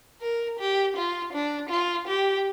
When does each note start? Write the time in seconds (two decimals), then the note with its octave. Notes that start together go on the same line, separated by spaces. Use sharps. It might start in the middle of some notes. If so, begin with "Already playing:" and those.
0.22 A#4
0.59 G4
0.97 F4
1.33 D4
1.70 F4
2.08 G4